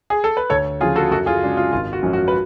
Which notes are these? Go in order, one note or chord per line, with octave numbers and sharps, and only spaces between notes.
G#4
A4
B4
D2 A4 C#5
C#3 F3 F4 G#4
F#4 A4
F#2 F#4 A4
F4 G#4
C#3 G#3 D4
F4
G#1 F4
F#4
F#2 F3 G#3 C#4
F#4
B4